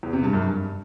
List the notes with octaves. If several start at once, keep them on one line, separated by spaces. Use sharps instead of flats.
E2
C3
G2
F#2
G2